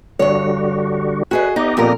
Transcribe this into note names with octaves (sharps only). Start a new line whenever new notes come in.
G2 D3 G3 F#4 C#5
F#4 G#4 B4 D#5
B3 D#4 G4 D#5
F2 A#2 A#4